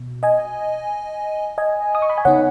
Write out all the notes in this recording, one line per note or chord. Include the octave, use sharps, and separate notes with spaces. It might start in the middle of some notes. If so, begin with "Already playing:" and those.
Already playing: B2
D#5 G#5
D#5 G#5
D#6
C#6
B5
G#5
C#3 B3 D#4 C#5 F#5